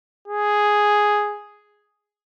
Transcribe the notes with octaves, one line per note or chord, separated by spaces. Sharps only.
G#4